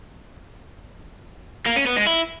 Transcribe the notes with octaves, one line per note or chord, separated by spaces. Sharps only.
A#3
C#4
B3
G#3
E4